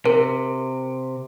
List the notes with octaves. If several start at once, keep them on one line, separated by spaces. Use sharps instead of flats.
C3 A#4